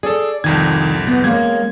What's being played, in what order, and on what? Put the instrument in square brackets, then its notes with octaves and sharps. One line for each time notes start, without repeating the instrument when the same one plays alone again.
[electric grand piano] G#4 A4 [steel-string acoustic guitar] D5
[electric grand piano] C2 F2 G#6 [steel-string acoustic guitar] D#3
[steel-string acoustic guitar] B3
[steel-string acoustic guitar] G#3 A#3 C#4 [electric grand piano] G#6